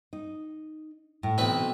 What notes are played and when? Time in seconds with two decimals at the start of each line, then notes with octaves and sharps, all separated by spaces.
0.13 D#4
1.23 A2
1.38 B1 E3 C4 B4